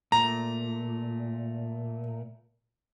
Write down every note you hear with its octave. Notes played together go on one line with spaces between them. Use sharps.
A#2 A3 A#5